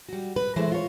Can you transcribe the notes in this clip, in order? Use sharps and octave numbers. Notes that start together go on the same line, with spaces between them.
G3 F#4
B4
E3 G#3 A3 E4 B4 C5
F4 C#5